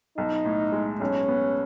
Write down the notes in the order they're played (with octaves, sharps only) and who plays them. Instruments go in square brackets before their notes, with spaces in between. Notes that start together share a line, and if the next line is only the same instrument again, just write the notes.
[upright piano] B1 [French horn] D#4
[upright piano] A2
G#3
[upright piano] B1 [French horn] C#4
[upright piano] B3